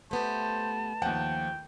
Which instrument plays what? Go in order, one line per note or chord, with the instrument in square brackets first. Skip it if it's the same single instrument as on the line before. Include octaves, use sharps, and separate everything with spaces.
[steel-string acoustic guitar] A3 B3 G4 [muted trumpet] C5 [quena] A5
[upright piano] D#2 F#5 [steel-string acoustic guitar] F3 [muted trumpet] G5